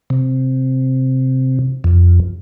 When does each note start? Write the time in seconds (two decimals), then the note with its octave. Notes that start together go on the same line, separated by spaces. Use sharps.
0.10 C3
1.84 F2